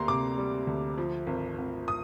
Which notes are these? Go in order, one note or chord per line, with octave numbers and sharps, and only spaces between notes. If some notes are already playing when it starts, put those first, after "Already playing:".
Already playing: D2 G3 A#3 A#5 C6
C3 D6
G3
D2
F3
G#1
G#1
D#6